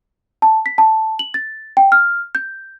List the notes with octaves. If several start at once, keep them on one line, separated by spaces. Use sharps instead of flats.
A5
B6
A5
F#7
A6
G5
F6
G6